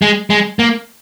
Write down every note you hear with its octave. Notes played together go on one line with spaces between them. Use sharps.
G#3
G#3
A#3